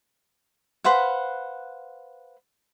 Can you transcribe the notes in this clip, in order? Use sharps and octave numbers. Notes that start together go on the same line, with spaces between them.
B4 C5 F5 F#5